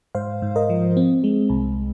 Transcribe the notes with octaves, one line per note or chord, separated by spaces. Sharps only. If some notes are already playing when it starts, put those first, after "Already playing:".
G#2 C5 F5
G#2
A#4 D#5
F3
C4
G#3
C2